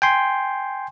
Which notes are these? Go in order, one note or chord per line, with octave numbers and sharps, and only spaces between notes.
G5 G#5 C6